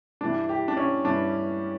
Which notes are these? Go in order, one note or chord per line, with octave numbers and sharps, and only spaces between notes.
G2 E3 G3 D4
G4
D4
C#4
G2 E3 G3 D4